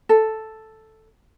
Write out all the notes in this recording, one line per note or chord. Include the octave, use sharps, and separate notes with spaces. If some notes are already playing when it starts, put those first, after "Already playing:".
A4